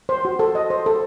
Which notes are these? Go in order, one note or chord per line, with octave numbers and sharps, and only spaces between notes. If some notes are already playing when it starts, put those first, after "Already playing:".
C5
F#4
A4
D#5
C5
A4